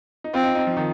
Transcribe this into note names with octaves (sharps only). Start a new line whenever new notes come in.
D#4
C4 F4
D#4
D#4
F3
D#3